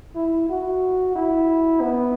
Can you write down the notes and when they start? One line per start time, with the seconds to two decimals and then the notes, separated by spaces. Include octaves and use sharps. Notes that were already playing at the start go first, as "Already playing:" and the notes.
0.16 E4
0.50 F#4
1.16 E4
1.81 B3